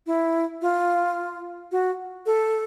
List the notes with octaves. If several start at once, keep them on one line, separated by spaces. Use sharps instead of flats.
E4
F4
F#4
A4